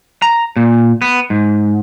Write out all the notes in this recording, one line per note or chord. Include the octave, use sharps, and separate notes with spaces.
A#5
A#2
B3
G#2